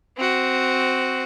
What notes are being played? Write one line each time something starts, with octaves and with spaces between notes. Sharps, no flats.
C4 F#4